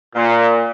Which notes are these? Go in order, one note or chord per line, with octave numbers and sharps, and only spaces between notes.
A#2